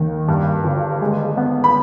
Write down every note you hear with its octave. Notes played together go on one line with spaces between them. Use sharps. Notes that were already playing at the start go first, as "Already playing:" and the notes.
Already playing: D#2 D#3
G2
G1
G#3
B3
B5